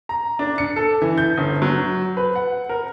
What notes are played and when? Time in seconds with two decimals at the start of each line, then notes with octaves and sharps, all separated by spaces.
0.09 A#5
0.39 D4
0.58 C#7
0.76 A4
1.02 E3
1.18 G6
1.38 G1
1.62 F#3
2.17 B4
2.36 F#5
2.69 A#4